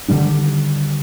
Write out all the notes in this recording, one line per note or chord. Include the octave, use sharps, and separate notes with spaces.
D3 D#3 G3 D4